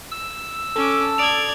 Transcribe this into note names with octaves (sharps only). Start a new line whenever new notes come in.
E6
C#4 A4 D6
D5 D#6 G#6 D7 F7